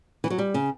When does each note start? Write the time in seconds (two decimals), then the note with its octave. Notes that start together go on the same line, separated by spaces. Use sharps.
0.24 E3
0.30 F#3
0.38 G3
0.54 C#3